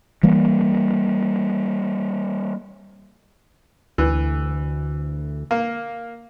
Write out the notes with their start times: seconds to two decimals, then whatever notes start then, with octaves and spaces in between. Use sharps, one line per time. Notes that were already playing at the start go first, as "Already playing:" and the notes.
0.23 E3 G3 A#3
3.98 D2 E3
5.51 A#3